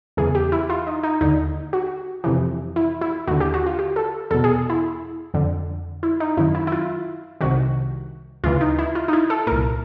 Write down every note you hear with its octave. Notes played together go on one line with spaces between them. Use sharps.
E2 C#3 E3 G#4
G4
E4
F4
D#4
D#4
D#2 D3 D#4
F#4
F2 C3 E3
E4
E4
D#2 D3 F#4
G4
F#4
F4
G4
A4
E2 B2 A4
G#4
E4
F2 D3
E4
D#4
F#2 D#3 E4
E4
E4
F4
C2 C3 D#3 F#4
D2 C#3 E3 F4
D#4
E4
F4
D#4
E4
A4
C2 A#2 A#4